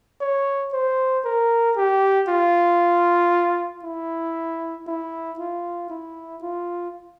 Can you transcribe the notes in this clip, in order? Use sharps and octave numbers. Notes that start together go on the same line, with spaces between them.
C#5
C5
A#4
G4
F4
E4
E4
F4
E4
F4